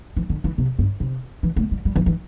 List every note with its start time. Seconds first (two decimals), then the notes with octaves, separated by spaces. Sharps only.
0.16 E3
0.30 D3
0.44 E3
0.58 C3
0.79 G2
1.00 C3
1.43 E3
1.56 A3
1.71 G3
1.85 G3
1.96 E3
2.06 E3